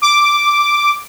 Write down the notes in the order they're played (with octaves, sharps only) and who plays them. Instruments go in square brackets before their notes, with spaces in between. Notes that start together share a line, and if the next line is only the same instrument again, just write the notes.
[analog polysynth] D6